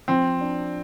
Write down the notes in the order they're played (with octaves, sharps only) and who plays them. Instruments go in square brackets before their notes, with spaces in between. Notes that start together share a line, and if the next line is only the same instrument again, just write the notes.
[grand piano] F3 [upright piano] C4
[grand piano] D4